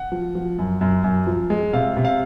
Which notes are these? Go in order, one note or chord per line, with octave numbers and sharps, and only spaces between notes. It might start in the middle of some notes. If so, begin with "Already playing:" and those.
Already playing: F#5
F3
F3
F#2
F#2
F#2
F3
G#3
C3 F5
C3
F5